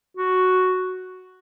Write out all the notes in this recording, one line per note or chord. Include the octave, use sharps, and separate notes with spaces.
F#4